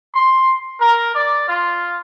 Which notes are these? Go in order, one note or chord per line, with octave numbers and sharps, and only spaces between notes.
C6
A#4
D5
F4